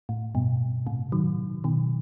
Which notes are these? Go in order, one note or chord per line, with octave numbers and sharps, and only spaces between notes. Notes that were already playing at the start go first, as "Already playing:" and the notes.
A2
G2 B2
A2 C3
D#3 F#3
B2 D#3